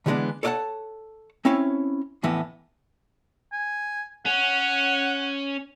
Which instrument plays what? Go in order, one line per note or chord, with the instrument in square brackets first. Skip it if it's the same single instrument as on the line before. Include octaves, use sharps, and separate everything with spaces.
[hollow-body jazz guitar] D3 E3 G3 G#3 B3 D4
A4 C#5 D5 F5 F#5 A5
C4 C#4 E4 C#5 F5
F2 A2 E3 B3 E5
[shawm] G#5
[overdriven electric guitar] C#4 [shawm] F#5